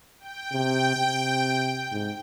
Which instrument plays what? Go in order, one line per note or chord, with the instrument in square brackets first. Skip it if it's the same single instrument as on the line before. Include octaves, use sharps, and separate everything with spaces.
[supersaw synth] G5
[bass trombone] C3
C3
G#2